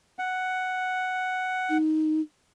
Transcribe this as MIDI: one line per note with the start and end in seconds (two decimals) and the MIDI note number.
0.19 1.78 78
1.69 2.20 63